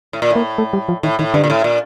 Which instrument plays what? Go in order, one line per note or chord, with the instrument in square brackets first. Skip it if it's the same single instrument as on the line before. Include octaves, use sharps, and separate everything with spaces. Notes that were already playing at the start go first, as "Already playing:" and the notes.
[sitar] A2
A#2
A2
[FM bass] A#3
A3
G3
F3
[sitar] A2 [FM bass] D#3
[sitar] A2 [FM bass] D#3
[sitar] G2 [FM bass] D3
[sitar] A#2
A2
A#2